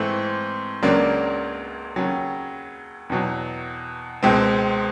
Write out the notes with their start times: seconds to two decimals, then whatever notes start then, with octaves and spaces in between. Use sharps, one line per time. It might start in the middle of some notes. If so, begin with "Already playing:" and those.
Already playing: G#2 E3 A3 C4
0.82 C#2 C#3 F#3 A#3 D4
1.96 D#2 C#3 F#3
3.10 E2 B2 F#3
4.23 C#2 B2 G#3 C4